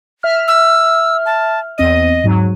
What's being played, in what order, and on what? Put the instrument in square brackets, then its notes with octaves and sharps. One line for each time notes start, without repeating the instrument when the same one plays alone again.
[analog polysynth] E5 F6
[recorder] E6
A5
[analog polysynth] E2 C4 D#7 [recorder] D#5
[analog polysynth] G#2 F#3